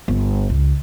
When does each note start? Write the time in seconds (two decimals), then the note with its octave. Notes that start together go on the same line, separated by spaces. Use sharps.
0.08 G1
0.50 C#2